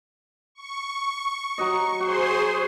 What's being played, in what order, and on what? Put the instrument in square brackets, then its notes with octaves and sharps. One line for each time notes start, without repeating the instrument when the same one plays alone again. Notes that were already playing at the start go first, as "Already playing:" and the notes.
[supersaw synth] C#6
[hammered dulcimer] F#3 F#4 D#5
[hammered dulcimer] F#4 [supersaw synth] G#4 C5 C6